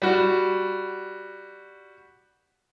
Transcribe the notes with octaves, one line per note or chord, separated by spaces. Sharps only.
G3 F#4